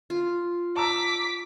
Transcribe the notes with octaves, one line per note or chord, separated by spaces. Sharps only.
F4
A5 A#5 D6 E6 B6